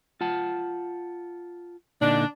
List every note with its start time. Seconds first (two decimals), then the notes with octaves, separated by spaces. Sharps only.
0.21 F4 F#5 A5
2.01 A#2 D3 D4 D#4